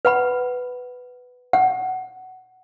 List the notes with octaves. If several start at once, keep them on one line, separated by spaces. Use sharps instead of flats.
B4 F#5 B5
F#5